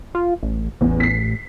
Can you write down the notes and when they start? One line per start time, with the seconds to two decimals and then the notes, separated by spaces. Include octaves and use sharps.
0.15 F4
0.43 A1
0.81 A1 E2
1.00 B6 C7